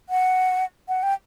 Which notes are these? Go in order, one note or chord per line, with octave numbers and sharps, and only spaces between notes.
F#5
F#5
G5